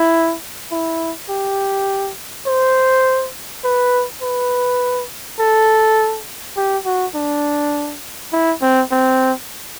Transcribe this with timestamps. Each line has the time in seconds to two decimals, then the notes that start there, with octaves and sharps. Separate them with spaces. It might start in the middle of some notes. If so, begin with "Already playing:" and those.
Already playing: E4
0.71 E4
1.29 G4
2.46 C5
3.64 B4
4.22 B4
5.39 A4
6.57 G4
6.85 F#4
7.15 D4
8.32 E4
8.62 C4
8.91 C4